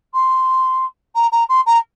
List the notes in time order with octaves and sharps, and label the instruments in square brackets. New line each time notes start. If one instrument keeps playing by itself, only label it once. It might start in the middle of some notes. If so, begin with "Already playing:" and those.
[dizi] C6
A#5
A#5
C6
A#5